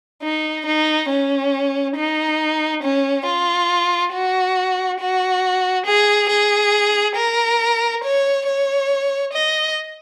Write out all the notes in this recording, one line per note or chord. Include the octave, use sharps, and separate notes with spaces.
D#4
D#4
C#4
D#4
C#4
F4
F#4
F#4
G#4
G#4
A#4
C#5
C#5
D#5